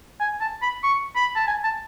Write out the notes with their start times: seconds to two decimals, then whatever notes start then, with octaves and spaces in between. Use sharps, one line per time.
0.20 G#5
0.41 A5
0.62 B5
0.83 C#6
1.16 B5
1.36 A5
1.48 G#5
1.64 A5